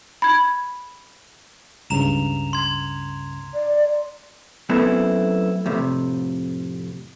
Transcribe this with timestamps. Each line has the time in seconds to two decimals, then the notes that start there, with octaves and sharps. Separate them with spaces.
0.22 B5 G#6
1.90 C#2 G2 C#3 A#5 E7 F7
2.53 C6 G#6
3.54 D5
4.69 F#2 A3 B3 C4 E4
5.66 F2 A2 C3